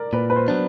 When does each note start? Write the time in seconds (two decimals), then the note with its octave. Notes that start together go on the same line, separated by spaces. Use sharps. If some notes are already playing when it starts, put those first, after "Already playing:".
Already playing: A#4 D5
0.13 A#2 B4
0.30 B4
0.36 C5
0.48 F#3 B3 D4